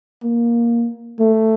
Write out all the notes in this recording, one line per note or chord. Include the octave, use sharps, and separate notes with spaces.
A#3
A3